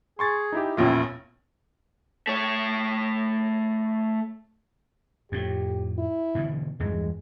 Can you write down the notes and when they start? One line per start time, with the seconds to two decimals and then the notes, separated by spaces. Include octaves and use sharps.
0.19 G#4 C6 C#6 A6
0.52 D#4 E4 G4
0.77 E1 A#1 E2 C#4 E4 F4
2.27 A3 C#5
5.32 F2 A2 G4
5.98 E4
6.35 B2 D3 E3
6.80 E2 G2 E3 G#3